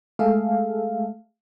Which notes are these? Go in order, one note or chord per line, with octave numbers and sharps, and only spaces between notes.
G#3 A3 G#4 A4 E5 F5